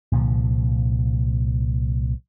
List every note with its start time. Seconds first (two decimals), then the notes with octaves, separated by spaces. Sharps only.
0.12 C2 A#2 D3 F3